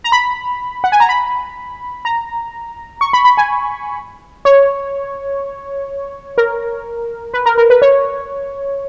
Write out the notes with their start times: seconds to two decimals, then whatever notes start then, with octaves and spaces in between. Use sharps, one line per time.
0.04 A#5
0.12 B5
0.84 F#5
0.92 G#5
1.00 A#5
1.09 B5
2.05 A#5
3.01 C#6
3.13 B5
3.25 B5
3.37 G#5
4.45 C#5
6.38 A#4
7.34 B4
7.46 A#4
7.58 A#4
7.70 B4
7.82 C#5